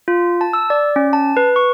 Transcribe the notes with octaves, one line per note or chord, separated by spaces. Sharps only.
F4
A5
E6
D5
C#4
A5
B4
C#6